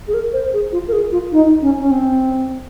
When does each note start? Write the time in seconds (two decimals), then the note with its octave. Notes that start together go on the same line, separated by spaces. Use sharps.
0.08 G#4
0.14 A#4
0.33 C5
0.53 G#4
0.72 F4
0.88 A#4
0.93 G#4
1.12 F4
1.32 D#4
1.62 C#4
1.79 C#4
1.91 C4